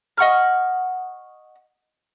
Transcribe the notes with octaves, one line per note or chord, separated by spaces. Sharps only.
D#5 F#5 C#6 F6